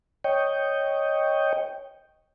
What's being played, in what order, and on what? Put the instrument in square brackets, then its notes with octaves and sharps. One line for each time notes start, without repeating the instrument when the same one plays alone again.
[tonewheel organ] C#5 D#5 G5